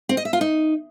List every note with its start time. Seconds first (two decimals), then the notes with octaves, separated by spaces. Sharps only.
0.09 C4
0.17 D#5
0.25 E5
0.33 F4
0.41 D#4